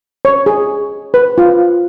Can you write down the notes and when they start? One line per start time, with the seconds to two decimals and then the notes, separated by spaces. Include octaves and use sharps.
0.25 C#5
0.46 G#4
1.14 B4
1.38 F4